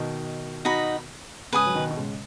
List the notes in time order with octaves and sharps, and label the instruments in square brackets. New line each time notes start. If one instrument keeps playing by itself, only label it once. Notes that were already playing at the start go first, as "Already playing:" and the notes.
Already playing: [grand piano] B2 D#3
[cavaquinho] D#4 F#4 D#5 B5
[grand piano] G#2 C#3 [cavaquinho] B4 G#5 D#6
[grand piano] F#3
B2 D#3
B2
G#2 C#3